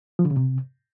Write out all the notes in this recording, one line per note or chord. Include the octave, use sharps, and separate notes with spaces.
F3
D3
C#3
C3